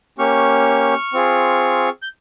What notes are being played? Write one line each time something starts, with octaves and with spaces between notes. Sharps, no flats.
A#3 C#4 G4 C#6 F6
C4 F4 G#4
G6